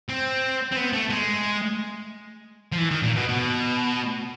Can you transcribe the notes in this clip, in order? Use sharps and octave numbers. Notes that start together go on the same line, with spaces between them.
C4
C4
B3
A3
G#3
F3
E3
D#3
A#2
B2
B2